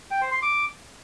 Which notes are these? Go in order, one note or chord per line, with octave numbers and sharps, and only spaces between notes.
G5
C5
C6
D6